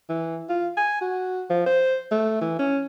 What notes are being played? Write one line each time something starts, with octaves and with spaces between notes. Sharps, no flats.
E3
F4
G#5
F#4
F3
C5
A3
E3
C#4